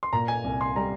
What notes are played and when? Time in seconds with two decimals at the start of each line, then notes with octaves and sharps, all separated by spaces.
0.03 C6
0.13 A#2 A#5
0.28 G#5
0.44 C2
0.61 C6
0.76 G3 A#5